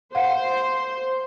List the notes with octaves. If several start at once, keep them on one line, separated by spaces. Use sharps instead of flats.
C5 F5 F#5